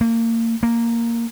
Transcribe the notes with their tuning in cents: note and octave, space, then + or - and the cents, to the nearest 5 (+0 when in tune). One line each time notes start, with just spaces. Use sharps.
A#3 -30
A#3 -5